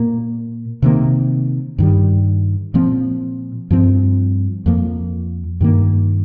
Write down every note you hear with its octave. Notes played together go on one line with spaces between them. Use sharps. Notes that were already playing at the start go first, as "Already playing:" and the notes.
Already playing: A#2 A#3
C3 D#3 A#3
G2 D#3 G3
A#2 F3 C4
G2 F3 C4
F2 F3 A#3
G2 D#3 A#3